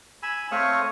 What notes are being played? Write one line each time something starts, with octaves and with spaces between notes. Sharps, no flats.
G#5 B5 E6
A3 C4 C#5 F5 C#6 D#6